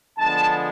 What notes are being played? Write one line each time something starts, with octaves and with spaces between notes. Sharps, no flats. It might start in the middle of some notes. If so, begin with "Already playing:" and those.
D3 F3 G#3 B3 A5